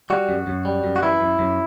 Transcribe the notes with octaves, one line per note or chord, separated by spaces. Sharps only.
G3 F#4
F#2
F#2
G3
F#2
F#4
E3 E4
F#2
F#2